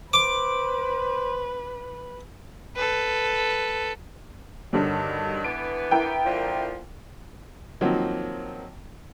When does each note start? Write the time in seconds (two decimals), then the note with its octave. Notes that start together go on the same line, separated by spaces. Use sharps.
0.13 B4 C5 D6
2.76 A4 B4
4.73 G2 D3 D#3 F#3 G3
5.44 D3 E3 B3 D7
5.91 E4 A#4 G5
6.25 A#2 D3 F3
7.81 D#3 F3 F#3 A#3 C4